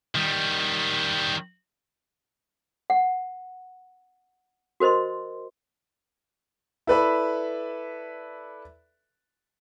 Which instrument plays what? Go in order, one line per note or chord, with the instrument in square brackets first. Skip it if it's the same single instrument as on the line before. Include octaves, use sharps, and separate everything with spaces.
[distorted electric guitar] D#3 G3
[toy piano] F#5
F#4 A#4 C5 D#5 C6
[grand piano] E4 A4 B4 D5 E5 B5